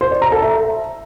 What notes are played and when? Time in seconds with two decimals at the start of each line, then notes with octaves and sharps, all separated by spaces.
0.01 C5
0.11 D5
0.22 A#5
0.32 A4
0.42 E5